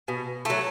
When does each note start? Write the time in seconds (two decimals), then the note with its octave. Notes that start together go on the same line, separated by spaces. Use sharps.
0.08 B2
0.45 F#3 A3